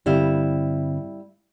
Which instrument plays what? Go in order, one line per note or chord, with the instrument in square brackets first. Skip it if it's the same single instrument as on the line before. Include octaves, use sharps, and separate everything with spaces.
[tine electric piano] G2 D3 C4 [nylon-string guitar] G3 E4 F5